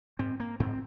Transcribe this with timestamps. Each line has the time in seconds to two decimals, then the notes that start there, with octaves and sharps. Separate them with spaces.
0.19 G#2 C4
0.40 A#3
0.60 G#2 C4